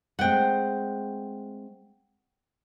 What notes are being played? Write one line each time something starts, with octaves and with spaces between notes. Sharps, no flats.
G#3 A3 C4 F#5 G5